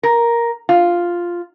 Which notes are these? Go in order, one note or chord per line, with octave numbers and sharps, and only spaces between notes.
A#4
F4